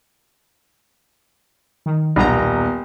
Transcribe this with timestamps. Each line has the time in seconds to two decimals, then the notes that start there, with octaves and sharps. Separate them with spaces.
1.86 D#3
2.16 D#1 B1 B3 A#5